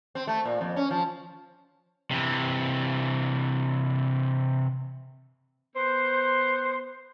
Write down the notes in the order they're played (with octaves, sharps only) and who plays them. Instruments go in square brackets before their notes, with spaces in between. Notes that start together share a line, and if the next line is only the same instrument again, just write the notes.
[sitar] C4
A3
A#2
F2
C#4
F3
[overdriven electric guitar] C3 E3
[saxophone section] B3 C5